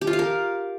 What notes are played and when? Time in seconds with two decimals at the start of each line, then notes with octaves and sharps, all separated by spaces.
0.01 G4
0.07 F4
0.13 F5
0.19 A#4